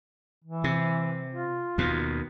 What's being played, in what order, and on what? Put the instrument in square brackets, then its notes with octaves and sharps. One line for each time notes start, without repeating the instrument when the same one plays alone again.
[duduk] E3
[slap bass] C3
[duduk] F4
[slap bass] D#2 B2